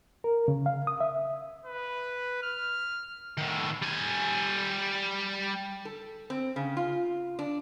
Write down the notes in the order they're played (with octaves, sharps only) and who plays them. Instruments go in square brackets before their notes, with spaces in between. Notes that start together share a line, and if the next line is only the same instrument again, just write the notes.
[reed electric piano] A#4
C#3
F5
D#6
E5
[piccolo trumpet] B4
F6
[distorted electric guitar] A2 D#3
G3 G#5
[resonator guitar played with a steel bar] A4
C4
C#3
F4
D4